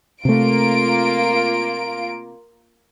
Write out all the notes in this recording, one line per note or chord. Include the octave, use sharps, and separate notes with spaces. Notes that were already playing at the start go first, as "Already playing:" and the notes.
C3 A3 A#3 F4 D7